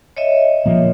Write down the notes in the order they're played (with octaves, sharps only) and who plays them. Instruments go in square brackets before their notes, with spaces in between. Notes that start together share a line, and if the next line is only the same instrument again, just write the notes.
[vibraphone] C#5 D#5 E5
[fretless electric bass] A#2 F3 A#3